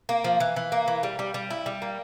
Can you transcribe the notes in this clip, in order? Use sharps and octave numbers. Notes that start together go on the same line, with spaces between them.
A#3
F3
E3
E3
A#3
E3
G3
G3
G3
E4
G3
A#3